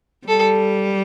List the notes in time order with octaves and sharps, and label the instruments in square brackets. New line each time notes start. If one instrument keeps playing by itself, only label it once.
[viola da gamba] G3 [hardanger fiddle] A4